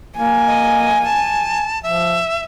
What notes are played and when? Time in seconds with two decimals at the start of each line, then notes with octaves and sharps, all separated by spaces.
0.18 A#3 G#5
0.47 D#5
1.04 A5
1.83 F3 E5